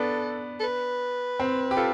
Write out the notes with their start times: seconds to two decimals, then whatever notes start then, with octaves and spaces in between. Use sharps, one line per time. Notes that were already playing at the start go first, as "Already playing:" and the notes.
Already playing: B3 D4 A4
0.60 A4
0.64 B4
1.40 C4
1.71 G4
1.77 F4 A4